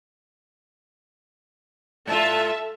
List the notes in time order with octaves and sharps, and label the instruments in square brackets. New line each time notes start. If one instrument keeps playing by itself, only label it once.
[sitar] G#2 F4 [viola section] A4 E5 A5